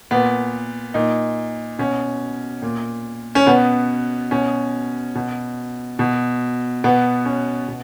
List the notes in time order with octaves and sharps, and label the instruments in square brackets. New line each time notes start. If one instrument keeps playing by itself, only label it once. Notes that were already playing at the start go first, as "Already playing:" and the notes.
[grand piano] A#2 B3
A#2 D#4
B2 C#4
A#2
C#4
B2 B3
B2 C#4
B2
B2
B2 B3
C#4
B2